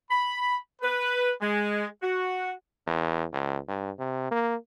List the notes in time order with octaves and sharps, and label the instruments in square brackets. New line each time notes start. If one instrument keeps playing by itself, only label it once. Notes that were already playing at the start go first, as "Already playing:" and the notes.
[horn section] B5
B4
G#3
F#4
[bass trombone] E2
C#2
G2
C3
A#3